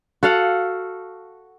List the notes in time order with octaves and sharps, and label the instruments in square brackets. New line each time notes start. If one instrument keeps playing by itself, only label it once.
[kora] F#4 A4 F5 F#5